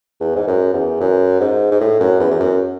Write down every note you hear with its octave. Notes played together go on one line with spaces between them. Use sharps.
E2
G#2
F#2
E2
F#2
G#2
G#2
A2
F#2
E2
E2
F#2